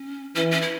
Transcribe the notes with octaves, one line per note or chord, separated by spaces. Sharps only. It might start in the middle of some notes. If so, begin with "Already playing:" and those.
Already playing: C#4
E3 C#4
C#4
E4